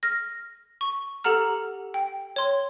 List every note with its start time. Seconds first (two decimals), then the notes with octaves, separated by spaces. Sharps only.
0.03 F6 A#6
0.81 C#6
1.24 G4 A4 F#5 A#5 F6
1.94 G5
2.36 C#5 C6